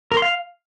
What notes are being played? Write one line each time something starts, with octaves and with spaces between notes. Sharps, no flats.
A#4
C6
F5